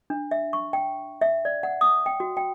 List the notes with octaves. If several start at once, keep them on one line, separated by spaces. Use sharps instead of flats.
D4
E5
C#6
G5
E5
D5
F#5
D#6
G5
F#4
G5